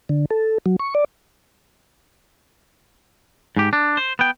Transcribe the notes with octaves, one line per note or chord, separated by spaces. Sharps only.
D3
A4
F#3
C#6
D5
G#2 G4
D4
C5
B3 G5